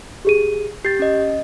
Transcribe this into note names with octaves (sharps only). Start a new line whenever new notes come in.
G4 G#4 D#7
G4 G6 A6 C7
C#4 D#5